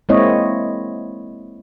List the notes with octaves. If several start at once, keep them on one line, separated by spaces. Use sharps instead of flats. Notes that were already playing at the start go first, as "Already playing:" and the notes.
G#3 A#3 C4 E4 C#5 D#5